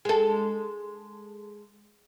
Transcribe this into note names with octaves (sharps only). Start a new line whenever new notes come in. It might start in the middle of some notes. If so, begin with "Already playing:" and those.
G#3 A4